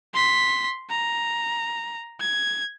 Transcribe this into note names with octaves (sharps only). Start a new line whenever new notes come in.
C6 B6
A#5
G#6